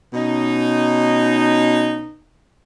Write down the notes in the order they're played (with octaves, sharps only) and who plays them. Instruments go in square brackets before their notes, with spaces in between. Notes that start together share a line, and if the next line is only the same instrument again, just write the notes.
[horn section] B2 C#4 D#4